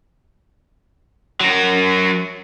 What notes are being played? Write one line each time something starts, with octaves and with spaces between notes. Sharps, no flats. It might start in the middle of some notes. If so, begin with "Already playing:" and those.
F#3 A#4